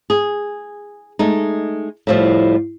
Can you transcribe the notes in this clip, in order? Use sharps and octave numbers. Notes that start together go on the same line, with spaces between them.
G#4
G#3 A3 D#4
A2 F3 G3